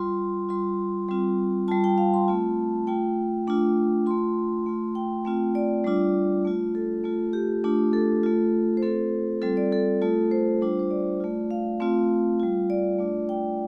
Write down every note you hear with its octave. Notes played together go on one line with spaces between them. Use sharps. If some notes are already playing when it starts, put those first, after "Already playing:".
Already playing: G3 F4 C6
G3 F4 C6
G3 C4 F4
G3 F4 A5
G5
F5
C6
A3 C4 F4 A5
A3 F4 G5
A3 D4 F4
A3 F4 C6
A3 F4
G5
A3 C4 F4
D5
G3 D4 F4
A3 F4
A4
A3 F4
G4
A3 D4 F4
A4
A3 F4
C5
A3 C4 F4 A4
G3 C4 F4 A4
D5
A4
A3 F4
C5
G3 D4 F4
C5
D5
A3 F4
F5
A3 C4 F4
G3 F4
D5
A3 D4 F4
G5